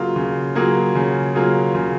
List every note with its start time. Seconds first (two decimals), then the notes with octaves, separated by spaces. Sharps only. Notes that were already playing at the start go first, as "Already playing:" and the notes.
Already playing: C#3 F#3 A#3 F4 G#4
0.16 C#3
0.55 F#3 A#3 F4 G#4
0.95 C#3
1.35 F#3 A#3 F4 G#4
1.75 C#3